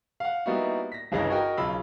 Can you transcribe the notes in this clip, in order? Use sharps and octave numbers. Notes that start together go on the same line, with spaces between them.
F5 F#5
G3 A#3 B3 D#4 E4 F#4
A#6 B6
G1 G2 C#3 E3 D#4 A#6
F#4 A#4 D#5 G5
B1 C#3 F4 B5 E6